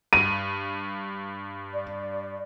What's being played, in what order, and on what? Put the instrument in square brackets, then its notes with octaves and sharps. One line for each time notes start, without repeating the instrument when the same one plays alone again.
[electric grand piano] G2 [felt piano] D#7
[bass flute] D5